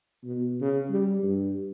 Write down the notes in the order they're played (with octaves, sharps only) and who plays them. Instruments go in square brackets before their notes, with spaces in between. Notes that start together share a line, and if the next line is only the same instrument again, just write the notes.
[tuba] B2
C#3
G3
G2